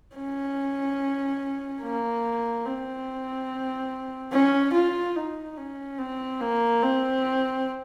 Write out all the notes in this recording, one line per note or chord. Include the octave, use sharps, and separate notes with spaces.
C#4
A#3
C4
C#4
F4
D#4
C#4
C4
A#3
C4